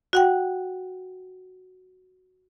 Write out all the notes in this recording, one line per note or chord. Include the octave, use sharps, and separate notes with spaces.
F#4 F#5 G5